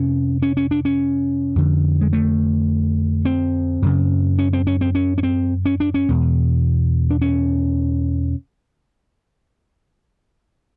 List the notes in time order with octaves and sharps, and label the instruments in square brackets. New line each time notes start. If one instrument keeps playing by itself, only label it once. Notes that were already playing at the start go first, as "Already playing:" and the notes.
Already playing: [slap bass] F2 C3 C#4
C#4
C#4
D4
C#4
F2 D3
G#3
A3
C4
F#2 C#3
C#4
C4
C#4
C4
C#4
C#4
C4
C#4
D4
C#4
E2 B2
D4
C#4